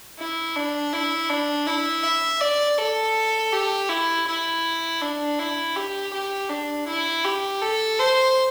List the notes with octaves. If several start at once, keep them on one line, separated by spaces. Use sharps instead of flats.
E4
D4
E4
D4
E4
E5
D5
A4
G4
E4
E4
D4
E4
G4
G4
D4
E4
G4
A4
C5